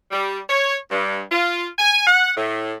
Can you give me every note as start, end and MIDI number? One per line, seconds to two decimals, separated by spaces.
0.11 0.38 55
0.49 0.76 73
0.91 1.21 43
1.32 1.65 65
1.78 2.01 80
2.07 2.30 78
2.36 2.75 45